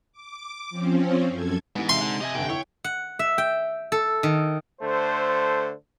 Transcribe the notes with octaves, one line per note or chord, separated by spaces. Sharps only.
D6
F3 C4 C#4
F#2 A4 G#6
G#2 E3 B3
C3 E5 F5 C6
D3
G4 D#5 E5 G#5
F1 D3 G5
E4 C#5
F#5
E5
G5
A4
D#3
D3 A3 C5